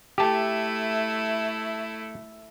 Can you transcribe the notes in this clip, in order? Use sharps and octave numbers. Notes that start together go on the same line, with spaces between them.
A3 E4 G4 A5